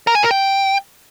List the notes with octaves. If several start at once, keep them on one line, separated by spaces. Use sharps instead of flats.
A#4
G#5
A#4
G5